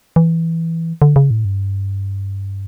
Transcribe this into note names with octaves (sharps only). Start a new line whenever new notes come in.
E3
D3
C#3
A2
G2